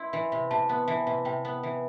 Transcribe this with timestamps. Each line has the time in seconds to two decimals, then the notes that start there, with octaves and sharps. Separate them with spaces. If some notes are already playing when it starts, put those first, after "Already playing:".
Already playing: E4 C6
0.13 E3
0.32 C3
0.51 C3 A5
0.69 B3
0.88 E3
1.07 C3
1.25 C3 G5
1.45 B3
1.63 E3